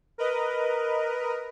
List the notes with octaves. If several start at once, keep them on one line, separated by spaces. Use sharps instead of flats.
A#4 B4 D#5